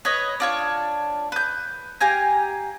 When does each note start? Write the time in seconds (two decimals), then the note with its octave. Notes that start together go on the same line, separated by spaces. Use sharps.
0.05 B4 C#5 D#5
0.40 D4 F4 C#5
1.32 B4 G6
2.01 G4 F5 G#5 A#5